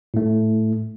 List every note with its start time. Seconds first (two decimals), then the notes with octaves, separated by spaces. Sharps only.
0.14 A2 A3